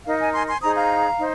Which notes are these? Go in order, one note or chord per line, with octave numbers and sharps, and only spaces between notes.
D#4 A#4 F5
D#5 G#5
G#5 C6
G#5 C6
D#4 G#4 C5 A#5 D#6
F5 A#5
D#4 C5